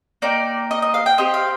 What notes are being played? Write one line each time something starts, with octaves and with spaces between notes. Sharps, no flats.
A#3 D#4 G4 D5
D#5
D#5
F5
G5
C4 G4 D#5
F5